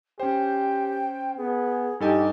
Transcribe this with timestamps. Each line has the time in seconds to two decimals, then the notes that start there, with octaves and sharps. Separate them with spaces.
0.20 C#4 G4 C5 G5
1.38 B3 G#4
2.00 G2 D#4 G4 A4 G#5